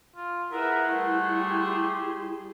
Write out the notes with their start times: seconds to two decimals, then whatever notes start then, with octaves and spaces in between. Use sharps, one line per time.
0.16 F4
0.52 E4 G#4 A#4 B4 E5 F#5
0.89 G3 A3 G#4 C6
1.40 G4